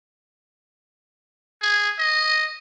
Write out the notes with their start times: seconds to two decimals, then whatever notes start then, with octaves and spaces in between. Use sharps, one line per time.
1.62 G#4
1.99 D#5